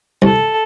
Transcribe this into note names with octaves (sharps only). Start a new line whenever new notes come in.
C2 A4